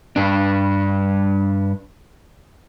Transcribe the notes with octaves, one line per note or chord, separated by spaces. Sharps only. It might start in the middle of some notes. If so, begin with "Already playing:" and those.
G2 D4